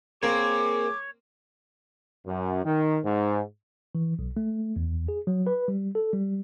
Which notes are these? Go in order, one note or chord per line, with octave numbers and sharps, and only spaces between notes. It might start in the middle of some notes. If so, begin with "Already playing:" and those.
A#3 C4 G#4 C#5 D6
F#2
D#3
G#2
E3
B1
A3
E2
G#4
F#3
B4
G3
A4
G3